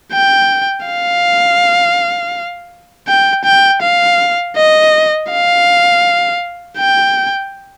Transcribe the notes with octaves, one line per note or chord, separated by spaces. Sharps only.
G5
F5
G5
G5
F5
D#5
F5
G5